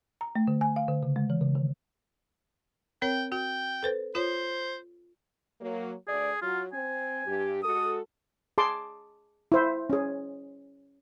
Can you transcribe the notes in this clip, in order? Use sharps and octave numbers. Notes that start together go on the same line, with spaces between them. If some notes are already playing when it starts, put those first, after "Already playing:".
A#5
A3
D3
G#5
F5
D3
C#3
G#3
E3
C#3
D#3
C4 A#4 C#5 G5
F#4 G5
A4 B4 C5
F4 C5 C#5
F#3 A#3
D2 G#4 D5
F#3 F4 F#4
C4 G#5
G2 G4
G#3 F#4 A4 D#6
G#4 A5 C6 D6
E4 C5 E5
C#4 G#4